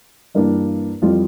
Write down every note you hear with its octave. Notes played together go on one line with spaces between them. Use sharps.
G2 E3 G3 A#3 D4
F2 E3 G3 F4